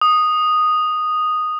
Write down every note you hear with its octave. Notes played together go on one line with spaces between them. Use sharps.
D#6